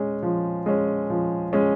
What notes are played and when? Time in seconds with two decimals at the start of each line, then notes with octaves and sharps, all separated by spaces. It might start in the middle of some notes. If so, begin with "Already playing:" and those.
Already playing: G#3 C#4
0.23 F3
0.66 G#3 C#4
1.10 F3
1.53 G#3 C#4